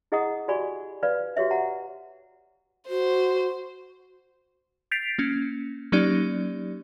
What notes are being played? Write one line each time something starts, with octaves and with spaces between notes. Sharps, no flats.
E4 G#4 D#5 F#5 A#5 D#6
F#4 G4 D5 G#5 B5 C#6
B4 D5 F5 B5
F#4 G4 C#5 E5
F#5 A#5
F#4 C5
G6 A6 B6 C7 D7 F7
A#3 C#4
F#3 A#3 C#4 D#4 G4 D5